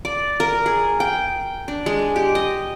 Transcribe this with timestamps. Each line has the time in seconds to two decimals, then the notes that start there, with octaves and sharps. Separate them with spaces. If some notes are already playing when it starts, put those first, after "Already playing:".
0.05 D5
0.40 A#4
0.66 G#4
1.00 G5
1.68 D4
1.86 G#3
2.16 G4
2.35 D#5